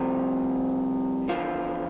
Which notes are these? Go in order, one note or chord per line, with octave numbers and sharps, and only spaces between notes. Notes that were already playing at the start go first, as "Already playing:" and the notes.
Already playing: C2 C3 F3
E2 D3 F3 F4